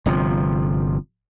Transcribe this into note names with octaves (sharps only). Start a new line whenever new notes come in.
G1 C3 F3